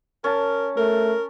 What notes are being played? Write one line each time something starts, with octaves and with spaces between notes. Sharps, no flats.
C#4 A#4 A5
A3 A#4